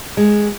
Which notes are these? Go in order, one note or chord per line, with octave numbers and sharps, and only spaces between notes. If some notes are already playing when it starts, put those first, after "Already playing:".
G#3